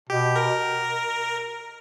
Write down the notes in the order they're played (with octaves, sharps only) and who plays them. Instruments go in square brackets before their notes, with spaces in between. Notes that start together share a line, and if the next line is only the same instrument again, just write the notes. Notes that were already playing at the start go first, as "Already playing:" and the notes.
[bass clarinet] B2 [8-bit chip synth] G4
[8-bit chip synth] A#4